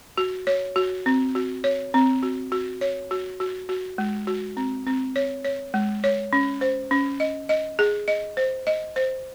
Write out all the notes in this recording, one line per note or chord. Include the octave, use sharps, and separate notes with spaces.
F#4
C#5
F#4
C4
F#4
C#5
C4
F#4
F#4
C#5
F#4
F#4
F#4
G#3
F#4
C4
C4
C#5
C#5
G#3
C#5
C#4
C5
C#4
D#5
D#5
G#4
D#5
C5
D#5
C5